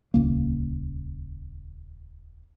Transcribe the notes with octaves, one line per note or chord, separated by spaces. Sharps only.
D#1 C#2 A#3